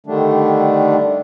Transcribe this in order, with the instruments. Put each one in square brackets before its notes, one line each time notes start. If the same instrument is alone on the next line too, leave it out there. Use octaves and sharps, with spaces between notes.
[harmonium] D3 D#3 G3 A3 D4